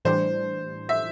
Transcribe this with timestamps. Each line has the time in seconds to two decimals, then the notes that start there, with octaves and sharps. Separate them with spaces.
0.05 A2 E3 G3 D4 C5
0.89 E5